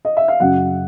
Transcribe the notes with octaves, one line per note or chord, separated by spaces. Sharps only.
D#5
E5
F5
F#2 C#3 F#3 F#5